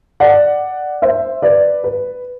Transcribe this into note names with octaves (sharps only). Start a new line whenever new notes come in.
D5 F#5
C5 E5
B4 D5
B4